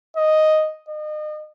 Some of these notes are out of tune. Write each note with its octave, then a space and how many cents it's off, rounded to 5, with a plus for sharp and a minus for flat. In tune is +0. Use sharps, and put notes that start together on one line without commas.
D#5 +0
D#5 -35